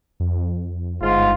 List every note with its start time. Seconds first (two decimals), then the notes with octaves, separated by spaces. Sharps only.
0.20 F2
1.01 G1 G#2 F4